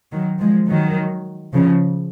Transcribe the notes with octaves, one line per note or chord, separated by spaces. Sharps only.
D#3 F#3
F3 G#3
D#3 F#3
C#3 F3